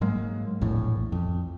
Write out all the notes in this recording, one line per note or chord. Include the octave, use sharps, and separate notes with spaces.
G#2 F#3 G#3 A#3
A#1 E2 A2
F2